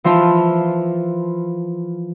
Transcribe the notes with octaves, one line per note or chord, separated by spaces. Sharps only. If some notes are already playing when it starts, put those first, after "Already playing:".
E3 F3 F4 E5 A5